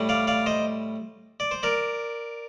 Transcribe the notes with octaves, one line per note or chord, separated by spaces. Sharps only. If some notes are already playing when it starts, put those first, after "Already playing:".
Already playing: A2 G3
D5 F5
D5 F5
C5 D#5
D5
C5
A#4 D5